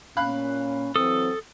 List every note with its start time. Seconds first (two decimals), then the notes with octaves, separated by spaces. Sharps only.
0.17 A#2 C#4 F5 B5 F#6
0.96 E3 F#3 C4 A4 D#6